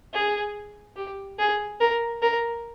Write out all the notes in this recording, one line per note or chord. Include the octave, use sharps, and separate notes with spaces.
G#4
G4
G#4
A#4
A#4